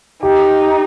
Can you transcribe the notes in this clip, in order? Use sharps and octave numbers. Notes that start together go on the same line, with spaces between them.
D#4 G4